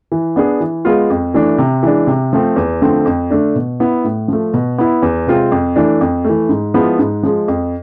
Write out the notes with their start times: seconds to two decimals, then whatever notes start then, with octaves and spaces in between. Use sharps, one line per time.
0.12 E3
0.36 B3 D4 G#4
0.60 E3
0.85 G#3 B3 F4
1.10 F2
1.34 E3 A3 D4
1.58 C3
1.83 E3 G#3 D4
2.07 C3
2.33 F3 A3 C4
2.56 E2
2.81 D3 F3 A3 C4
3.05 F2
3.30 D3 A3 D4
3.55 B2
3.80 B3 E4
4.04 A2
4.28 F3 A3
4.54 B2
4.78 B3 E4
5.02 E2
5.27 C3 G#3 C4 F4
5.52 F2
5.76 E3 A3 D4
6.01 F2
6.25 E3 A3
6.49 G#2
6.74 F3 G#3 B3 E4
6.99 G#2
7.23 F3 G#3
7.48 F2